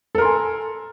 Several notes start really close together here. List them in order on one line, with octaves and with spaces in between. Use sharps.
A4 A#4 C6 G#5